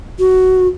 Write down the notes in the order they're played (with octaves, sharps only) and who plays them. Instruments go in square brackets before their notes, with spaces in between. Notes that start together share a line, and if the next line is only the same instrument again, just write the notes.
[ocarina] F#4